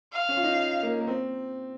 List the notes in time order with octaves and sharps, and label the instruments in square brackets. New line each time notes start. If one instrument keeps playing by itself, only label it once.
[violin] F5
[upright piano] C#4
F4
D#4
A#3
A#3
C4